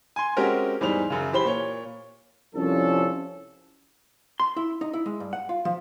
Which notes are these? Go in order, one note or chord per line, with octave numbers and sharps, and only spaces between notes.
G#5 C6
G#3 C4 C#4 F#4 G4 A#4
E2 G#2 G3 C5 F7
F#2 C#3
E3 G4 C5 B5 G7
A#2 C#5
C2 F3 C#4 A4
C6
E4
D#4
E4
G#3
G2
F#5
F4
F3